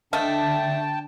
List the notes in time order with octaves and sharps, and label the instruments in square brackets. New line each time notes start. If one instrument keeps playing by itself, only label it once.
[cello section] D3 [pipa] A3 D#5 F5 [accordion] G5 A5